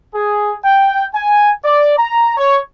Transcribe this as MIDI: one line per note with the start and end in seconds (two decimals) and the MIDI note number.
0.15 0.55 68
0.64 1.06 79
1.14 1.51 80
1.65 1.98 74
1.98 2.34 82
2.37 2.59 73